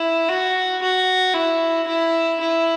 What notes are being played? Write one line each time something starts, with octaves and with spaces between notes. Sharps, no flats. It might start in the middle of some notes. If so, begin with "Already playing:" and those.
Already playing: E4
F#4
F#4
E4
E4
E4